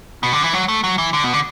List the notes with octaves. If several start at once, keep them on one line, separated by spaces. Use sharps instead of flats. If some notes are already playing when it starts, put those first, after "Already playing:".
B2
D3
E3
F#3
A3
F#3
E3
D3
B2
D3